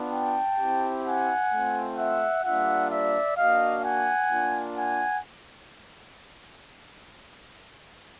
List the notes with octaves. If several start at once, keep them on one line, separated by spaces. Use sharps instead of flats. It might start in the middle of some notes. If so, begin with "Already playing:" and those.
Already playing: B3 D4 F4
G5 A5
C4 E4 G4
F#5 G#5
A3 C4 F4
E5 F#5
G3 A#3 D4 F4 E5 F#5
D5 E5
A#3 D4 F#4 D#5 F5
F#5 G#5
A#3 D4 F4
F#5 G#5